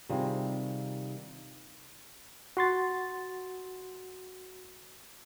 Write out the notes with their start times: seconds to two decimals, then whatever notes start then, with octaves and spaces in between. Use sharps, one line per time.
0.09 C3 D#3 G3 F4 G#4
2.57 F#4 C6 A6